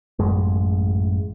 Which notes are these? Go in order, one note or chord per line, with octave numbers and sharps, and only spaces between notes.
A1 F#2 G#3